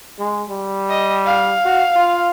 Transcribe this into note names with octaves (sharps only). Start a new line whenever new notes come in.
G#3
G3
D#5
F5
F#4
F4